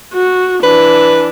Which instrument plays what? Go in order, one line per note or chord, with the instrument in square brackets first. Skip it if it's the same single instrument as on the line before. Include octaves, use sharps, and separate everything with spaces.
[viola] F#4
[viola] E3 D4 [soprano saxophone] B4